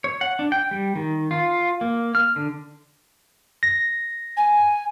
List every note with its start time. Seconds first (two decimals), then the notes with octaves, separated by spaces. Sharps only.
0.04 C#5
0.21 F#5
0.39 D4
0.52 G5
0.71 G3
0.96 D#3
1.31 F4
1.81 A#3
2.15 F6
2.36 D3
3.63 A#6
4.37 G#5